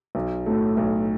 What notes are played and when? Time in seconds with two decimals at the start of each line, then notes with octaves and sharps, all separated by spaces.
0.15 B1
0.46 A2 F#3 A3
0.77 B1